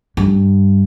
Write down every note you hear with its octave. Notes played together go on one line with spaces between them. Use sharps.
G2